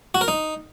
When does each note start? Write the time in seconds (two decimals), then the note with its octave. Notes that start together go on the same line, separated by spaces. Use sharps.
0.15 F#4
0.21 A#4
0.28 D#4